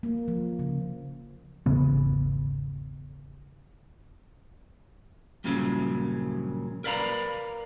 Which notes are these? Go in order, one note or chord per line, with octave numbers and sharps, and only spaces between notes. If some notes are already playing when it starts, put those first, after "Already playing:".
A#3
F3
C#3
G#1 E2 C#3 B3
G2 A#2 C#3 F3 F#3
A#4 B4 D5 F5 A#5 B5